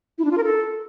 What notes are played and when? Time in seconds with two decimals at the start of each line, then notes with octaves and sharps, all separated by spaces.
0.18 E4
0.25 D4
0.31 F4
0.37 A#4
0.44 A4